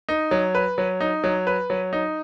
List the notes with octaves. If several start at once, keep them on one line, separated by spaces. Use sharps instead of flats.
D#4
F#3
B4
F#3
D#4
F#3
B4
F#3
D#4